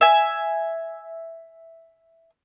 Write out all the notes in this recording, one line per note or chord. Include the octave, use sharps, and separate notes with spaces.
E5 G#5